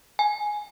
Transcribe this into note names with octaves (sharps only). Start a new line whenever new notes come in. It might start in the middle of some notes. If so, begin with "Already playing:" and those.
G#5